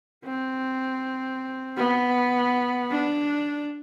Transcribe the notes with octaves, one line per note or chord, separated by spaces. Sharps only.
C4
B3
D4